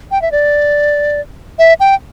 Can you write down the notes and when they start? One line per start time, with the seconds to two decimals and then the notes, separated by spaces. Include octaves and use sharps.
0.11 G5
0.22 E5
0.32 D5
1.59 E5
1.80 G5